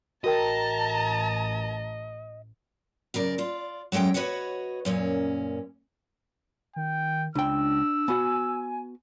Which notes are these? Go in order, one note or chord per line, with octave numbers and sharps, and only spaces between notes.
A1 F#4 A#4 D#5 G5 A5 A#5
F#2 C#3 A#4 D5
F4 D5
F#3 G#3 A3 C#4 G5
F#4 B4 C#5 D#5 F#5
F#2 A#2 C#4
D#3 G5
C#2 D4 G5 E6
B3 F#4 G#5